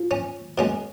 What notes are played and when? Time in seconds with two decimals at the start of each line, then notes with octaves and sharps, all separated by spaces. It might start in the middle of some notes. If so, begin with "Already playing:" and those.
Already playing: F3
0.11 C#4
0.58 B2 G#3 C#4